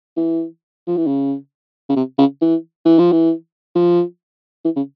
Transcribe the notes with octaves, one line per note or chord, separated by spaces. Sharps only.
E3
F3
E3
C#3
C#3
C3
C#3
E3
E3
F3
E3
F3
E3
C#3